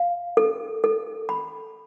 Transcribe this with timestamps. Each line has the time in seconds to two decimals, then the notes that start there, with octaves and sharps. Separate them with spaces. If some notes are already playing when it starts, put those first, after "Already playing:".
Already playing: F5
0.37 A4
0.84 A4
1.29 B5